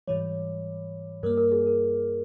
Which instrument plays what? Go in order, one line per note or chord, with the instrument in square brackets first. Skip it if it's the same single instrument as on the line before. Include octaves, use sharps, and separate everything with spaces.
[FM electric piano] G#2 E3 G3 [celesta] C#5
[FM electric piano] G2 G3 A#3 [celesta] A#4
[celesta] A#4
G#4
A#4